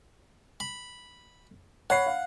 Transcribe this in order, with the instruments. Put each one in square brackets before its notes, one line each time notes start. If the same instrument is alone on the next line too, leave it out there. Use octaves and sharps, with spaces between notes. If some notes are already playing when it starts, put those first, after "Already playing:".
[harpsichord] B5
[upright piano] C#5 B5 C7 [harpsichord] F#5
[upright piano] F5